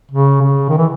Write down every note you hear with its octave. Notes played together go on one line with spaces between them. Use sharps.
C#3
C#3
D#3
E3